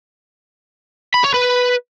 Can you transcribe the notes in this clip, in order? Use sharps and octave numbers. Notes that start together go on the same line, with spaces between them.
B5
C#5
B4